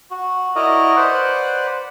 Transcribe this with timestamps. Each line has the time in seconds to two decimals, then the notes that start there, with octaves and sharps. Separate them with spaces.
0.11 F#4
0.56 E4 F#4 A#4 D5 D#5
0.96 B4 C5 D5 F#5